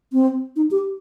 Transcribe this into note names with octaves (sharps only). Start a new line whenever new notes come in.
C4
D#4
G4